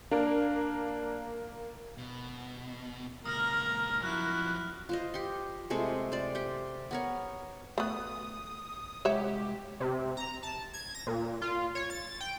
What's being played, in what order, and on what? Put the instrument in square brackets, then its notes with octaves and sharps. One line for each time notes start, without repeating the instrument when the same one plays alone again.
[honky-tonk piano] A#3 A#4 [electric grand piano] D4
[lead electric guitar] B2
[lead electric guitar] C#2 A#2 [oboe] A#4 [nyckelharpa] A#5 [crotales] D#6 F6
[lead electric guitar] F#2 F3 [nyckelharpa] E4 [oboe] F#4 [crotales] F6 F#6
[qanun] F4 C5 D#5
G4 C6
C3 G#3 A3 C4
C5 D5
G4 G5
B3 A#4 C#5
[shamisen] A3 B3 [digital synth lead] D#6
[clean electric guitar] C2 G#3 F#5 [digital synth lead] G4 [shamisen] C#5 E5
[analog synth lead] C3
A#5
A5
G#6
A#6
A#2
F4
C#5
A6
G5